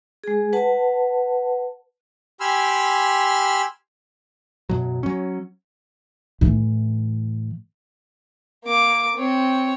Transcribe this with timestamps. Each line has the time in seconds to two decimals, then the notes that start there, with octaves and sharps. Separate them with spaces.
0.24 G#3 G#4
0.53 B4 F#5 A5
2.40 G4 G#5 B5 C6 E6 F6
4.70 F#2 B2 F#3
5.03 F#3 C#4
6.41 A2 E3
8.65 A#3 D6
9.16 C4 C#5